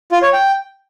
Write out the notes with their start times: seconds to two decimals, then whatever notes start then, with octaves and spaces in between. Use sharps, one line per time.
0.12 F4
0.23 C#5
0.33 G5